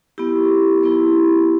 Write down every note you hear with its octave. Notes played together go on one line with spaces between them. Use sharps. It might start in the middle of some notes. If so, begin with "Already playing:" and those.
B3 E4 G4
B3 E4